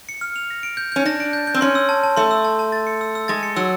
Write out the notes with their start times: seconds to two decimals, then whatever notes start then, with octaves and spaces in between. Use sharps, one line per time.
0.09 C#7
0.21 F6
0.36 F7
0.50 A#6
0.63 D7
0.77 G6
0.92 C#4 G6
1.05 D4 A#6
1.20 D7
1.33 G6
1.47 G6
1.54 C4
1.61 C#4 C6
1.75 E6
1.89 A5
2.03 A5
2.17 A3 C6
2.31 E6
2.44 A5
2.59 A5
2.72 A6
2.87 C#7
3.01 E6
3.15 E6
3.28 G#3 A6
3.43 C#7
3.56 F#3 E6